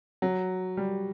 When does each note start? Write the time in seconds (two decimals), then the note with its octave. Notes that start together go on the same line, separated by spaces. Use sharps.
0.22 F#3
0.77 G3